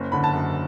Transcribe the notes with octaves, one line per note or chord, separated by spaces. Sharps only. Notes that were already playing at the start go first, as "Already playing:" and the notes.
Already playing: F#1 C#4
D3 B5
A5
F#2